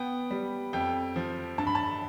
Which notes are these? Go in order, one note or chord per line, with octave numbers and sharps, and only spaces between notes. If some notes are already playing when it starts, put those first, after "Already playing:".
Already playing: B3 G5
G3
F2 G5
F3
G2 A5
B5
A5